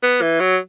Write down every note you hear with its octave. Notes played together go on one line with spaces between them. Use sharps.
B3
E3
F#3